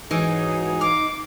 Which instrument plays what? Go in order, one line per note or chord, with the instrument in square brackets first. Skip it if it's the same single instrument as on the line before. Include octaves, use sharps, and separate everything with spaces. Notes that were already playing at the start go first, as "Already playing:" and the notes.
[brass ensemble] G#2 F#3 G#4 [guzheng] E3 [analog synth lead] D#4
[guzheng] F5 [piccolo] D6